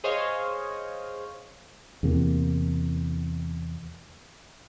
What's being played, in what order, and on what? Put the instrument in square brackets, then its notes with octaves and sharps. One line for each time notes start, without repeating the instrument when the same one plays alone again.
[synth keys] G#4 C5 C#5 D#5 F5
[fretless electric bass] E2 C3 A#3